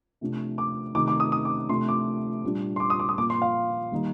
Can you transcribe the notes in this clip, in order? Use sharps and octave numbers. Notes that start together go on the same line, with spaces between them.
C3 F3 A3 D4
D6
C3 D#3 A3 D#4 D6
D6
D#6
D#6
D6
C3 F3 A3 D4 C6
D6
A#2 G3 D4
C6
D6
D#6
D6
D#6
A#2 F3 A#3 D6
C6
F5
D#3 G3 A#3 D#4